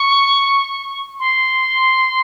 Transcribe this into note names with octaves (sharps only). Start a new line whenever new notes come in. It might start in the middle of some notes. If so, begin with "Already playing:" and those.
Already playing: C#6
C6